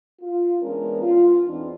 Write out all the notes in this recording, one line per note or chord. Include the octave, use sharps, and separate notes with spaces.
F4
E3 G#3 B3 C#4 D4 A#4
F4
E2 E3 C4 D4 D#4